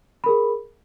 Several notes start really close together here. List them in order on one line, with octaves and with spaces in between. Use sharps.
B5 A#4 G#4